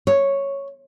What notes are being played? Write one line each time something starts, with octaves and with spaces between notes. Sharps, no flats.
C#5